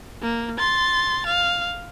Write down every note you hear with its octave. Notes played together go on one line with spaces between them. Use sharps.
A#3
C6 A6
F5